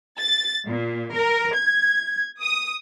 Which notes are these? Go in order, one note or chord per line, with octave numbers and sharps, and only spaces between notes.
A6
A#2
A#4
G#6
D#6